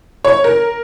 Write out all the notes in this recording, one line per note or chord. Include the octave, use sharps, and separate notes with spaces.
C#5
A#4